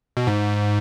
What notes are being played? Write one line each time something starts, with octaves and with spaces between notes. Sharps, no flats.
B2
G#2